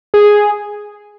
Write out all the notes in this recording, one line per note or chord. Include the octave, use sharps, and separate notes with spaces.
G#4